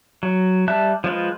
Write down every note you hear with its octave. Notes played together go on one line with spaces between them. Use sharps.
F#3
G3 E5 A5 F#6
F3 G#3 F4 B4